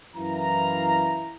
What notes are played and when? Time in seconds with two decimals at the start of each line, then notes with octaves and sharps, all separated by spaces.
0.16 F#2 E3 E4 F5 A#5